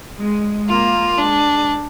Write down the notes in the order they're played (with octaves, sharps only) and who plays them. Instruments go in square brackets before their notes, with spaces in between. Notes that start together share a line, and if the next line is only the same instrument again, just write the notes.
[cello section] G#3
[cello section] A#3 [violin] F4
[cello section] G#3 [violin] D4